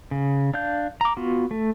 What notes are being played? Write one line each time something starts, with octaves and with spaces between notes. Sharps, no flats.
C#3
D4 F5 G6
A#5 D6
B3 F4 F#4
A3